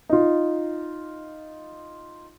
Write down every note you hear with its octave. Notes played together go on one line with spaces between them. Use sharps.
D#4 F4